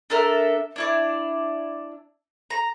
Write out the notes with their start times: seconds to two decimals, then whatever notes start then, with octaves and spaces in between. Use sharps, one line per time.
0.10 D4 A4 A#4 E5
0.76 D4 E4 D5
2.50 A#5